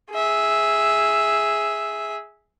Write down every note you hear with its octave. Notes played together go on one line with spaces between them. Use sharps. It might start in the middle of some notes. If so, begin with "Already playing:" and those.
G#4 E5